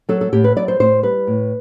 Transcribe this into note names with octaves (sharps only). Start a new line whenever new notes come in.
F#3 A4
A4
A2 G4
B4
F#3 D5
C5
A2 C5
G3 B4
A2